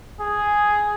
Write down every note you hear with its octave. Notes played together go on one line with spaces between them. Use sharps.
G#4